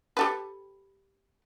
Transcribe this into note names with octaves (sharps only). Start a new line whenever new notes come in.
G4 A4 B4